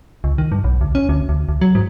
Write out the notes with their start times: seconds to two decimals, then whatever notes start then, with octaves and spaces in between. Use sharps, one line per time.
0.24 C#2
0.38 D#3
0.52 G2
0.64 B1
0.81 D2
0.95 C#4
1.09 D2
1.29 D2
1.49 D2
1.61 F#3
1.75 G#2